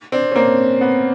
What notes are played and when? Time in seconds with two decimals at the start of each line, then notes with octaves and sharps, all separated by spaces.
0.12 C4 D4
0.31 C#4
0.36 A#3 C4
0.81 B3